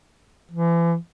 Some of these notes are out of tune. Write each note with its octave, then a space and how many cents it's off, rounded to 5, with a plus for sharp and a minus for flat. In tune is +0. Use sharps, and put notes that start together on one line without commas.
E3 +40